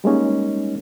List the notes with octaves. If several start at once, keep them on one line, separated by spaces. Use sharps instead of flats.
G3 G#3 A#3 C#4 D#4